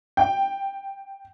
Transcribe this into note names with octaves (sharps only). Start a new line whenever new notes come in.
G5